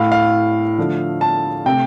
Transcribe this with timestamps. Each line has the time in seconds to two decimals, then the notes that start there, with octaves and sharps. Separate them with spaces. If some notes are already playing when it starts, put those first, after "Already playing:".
Already playing: A2 A3 F5
0.12 F5
0.78 D3 F3 A3
1.21 A5
1.66 C3 A3 G5